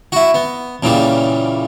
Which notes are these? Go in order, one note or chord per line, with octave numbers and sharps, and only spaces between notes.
E4 F#4
B3
A#2 C#3 E3 G3